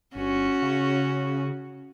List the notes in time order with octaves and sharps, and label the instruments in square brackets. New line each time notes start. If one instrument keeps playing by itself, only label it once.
[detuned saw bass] G1 [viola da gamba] C#4 F#4
[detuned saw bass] C#3